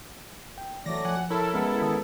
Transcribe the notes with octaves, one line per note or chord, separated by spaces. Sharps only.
G5
E3 F#3 A3 D5 A#6
F3 F#5 G#5
E4 A4 A#4 C#5
G#3 B3 C#4 A#4
D#3 D#6